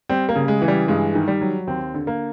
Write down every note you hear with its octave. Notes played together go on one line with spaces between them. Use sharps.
G3 C4
A#3
C#3
G#3
E3
G3
G2 G#3
D#3
G3
F#3
D#2 C4
D3
A#3